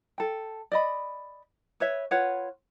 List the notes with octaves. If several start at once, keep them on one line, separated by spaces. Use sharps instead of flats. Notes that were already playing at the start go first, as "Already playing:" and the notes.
A4 G5
D5 D#5 B5
B4 C#5 E5
F4 B4 C#5 F#5